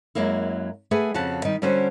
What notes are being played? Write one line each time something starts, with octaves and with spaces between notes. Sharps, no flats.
F#2 F#3 G#3 A#3 E4
A3 G#4 B4 F#5 G#5
F2 C#3 F#4 F#5 A5
D#3 G3 D#4
D3 G3 C#4 F#4 C5